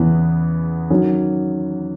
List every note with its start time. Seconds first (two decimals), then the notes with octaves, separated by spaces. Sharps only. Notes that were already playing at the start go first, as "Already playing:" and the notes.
Already playing: E2 C#3 E3 B3
0.90 D#3 F#3 C#4